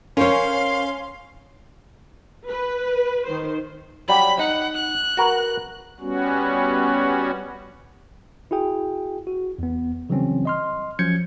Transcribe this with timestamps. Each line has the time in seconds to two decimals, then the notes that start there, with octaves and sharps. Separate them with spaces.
0.17 C#4 A#4 C5 C#5 F5 C6
2.49 B4
3.27 D#3 C5
4.08 F#3 G3 B5 B6
4.39 D#4 F#5
4.75 F#6
5.17 F#4 A#4 B4
6.00 G3 B3 C#4 F#4
8.51 E4 F#4 G#4 G5
9.27 F#4
9.59 E2 B3
10.10 C#3 E3 F#3 G3 C4 C#4
10.45 D#5 C6 F6
10.99 F3 F#3 C#4 G6 G#6 C#7